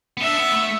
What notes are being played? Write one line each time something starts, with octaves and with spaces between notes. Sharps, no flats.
B3
D4 E5
B3
A3